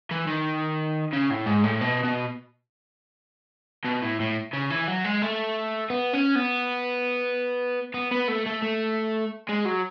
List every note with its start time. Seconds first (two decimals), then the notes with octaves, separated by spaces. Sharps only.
0.11 E3
0.27 D#3
1.13 C#3
1.30 A2
1.46 G#2
1.64 A2
1.81 B2
2.04 B2
3.85 B2
4.02 A2
4.20 A2
4.53 C#3
4.70 E3
4.88 F#3
5.04 G#3
5.22 A3
5.90 B3
6.13 C#4
6.35 B3
7.94 B3
8.11 B3
8.28 A3
8.47 A3
8.63 A3
9.49 G#3
9.65 F#3